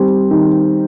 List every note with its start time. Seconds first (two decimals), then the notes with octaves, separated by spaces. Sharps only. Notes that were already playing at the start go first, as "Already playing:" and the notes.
Already playing: D#3 G3 C4
0.31 D#3